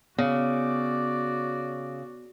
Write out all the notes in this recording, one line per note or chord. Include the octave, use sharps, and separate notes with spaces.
C#3 B3 F#4 D5